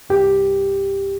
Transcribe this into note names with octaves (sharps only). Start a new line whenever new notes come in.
C2 G2 G4